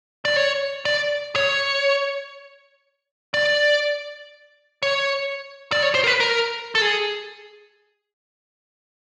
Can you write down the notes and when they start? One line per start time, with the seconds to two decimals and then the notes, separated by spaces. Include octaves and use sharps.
0.25 D5
0.36 C#5
0.85 D5
1.36 C#5
3.34 D5
4.83 C#5
5.72 D5
5.83 C#5
5.95 C5
6.04 A#4
6.07 B4
6.20 A#4
6.75 A4
6.82 G#4